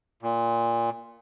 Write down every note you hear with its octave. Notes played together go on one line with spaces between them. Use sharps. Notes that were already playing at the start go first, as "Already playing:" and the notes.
A#2